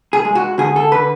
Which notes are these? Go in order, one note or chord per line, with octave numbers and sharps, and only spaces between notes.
G#4
G#3
F#4
D3 G#4
A4
D3 B4